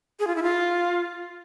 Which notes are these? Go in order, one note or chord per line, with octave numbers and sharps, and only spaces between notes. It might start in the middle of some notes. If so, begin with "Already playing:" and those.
G#4
F4
E4
F4